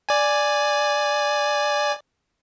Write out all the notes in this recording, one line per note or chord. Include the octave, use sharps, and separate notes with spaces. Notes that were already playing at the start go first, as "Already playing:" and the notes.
D5 G#5